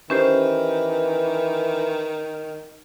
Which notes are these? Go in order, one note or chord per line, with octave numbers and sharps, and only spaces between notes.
D#3 E3 C#4 G4 C5